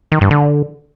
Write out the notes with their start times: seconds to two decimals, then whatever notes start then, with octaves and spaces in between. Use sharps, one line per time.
0.12 D#3
0.21 G2
0.31 D3